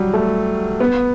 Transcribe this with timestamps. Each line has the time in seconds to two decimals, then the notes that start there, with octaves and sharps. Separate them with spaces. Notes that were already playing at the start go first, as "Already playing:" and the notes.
Already playing: F#3 G3
0.13 A3
0.80 B3